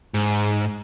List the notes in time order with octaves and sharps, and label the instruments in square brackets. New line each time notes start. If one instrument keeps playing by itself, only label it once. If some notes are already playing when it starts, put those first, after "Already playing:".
[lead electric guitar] G#2